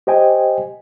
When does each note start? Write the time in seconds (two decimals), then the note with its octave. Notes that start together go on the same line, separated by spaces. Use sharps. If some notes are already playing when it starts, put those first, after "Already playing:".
0.07 G4 C5 D#5 G5 G#5